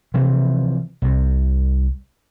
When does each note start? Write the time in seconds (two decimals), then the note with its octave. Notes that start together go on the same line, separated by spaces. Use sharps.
0.14 C3 E3 F3
1.02 C2 C3